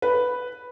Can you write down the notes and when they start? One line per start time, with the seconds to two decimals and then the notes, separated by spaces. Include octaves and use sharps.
0.02 B4